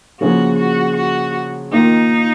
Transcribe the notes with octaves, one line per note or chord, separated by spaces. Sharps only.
C#3 F3 A#3 C#4 F#4 G#4
F#4
F#4
D#3 A#3 D#4 F4 A#4